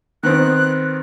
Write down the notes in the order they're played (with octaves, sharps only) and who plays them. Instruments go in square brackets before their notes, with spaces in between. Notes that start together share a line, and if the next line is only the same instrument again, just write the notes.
[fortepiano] D#3 B3 C4 [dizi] F#6